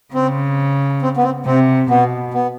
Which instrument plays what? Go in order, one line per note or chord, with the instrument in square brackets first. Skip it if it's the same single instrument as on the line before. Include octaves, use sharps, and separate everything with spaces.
[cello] C#3 [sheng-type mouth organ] C4
[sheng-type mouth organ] C4
B3
C4
[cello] C3 [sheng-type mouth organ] C4
[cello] B2 [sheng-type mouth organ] B3
[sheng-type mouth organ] B3